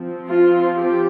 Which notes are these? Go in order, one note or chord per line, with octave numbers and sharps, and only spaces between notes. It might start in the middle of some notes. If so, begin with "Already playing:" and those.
Already playing: F3 C4
F4
G4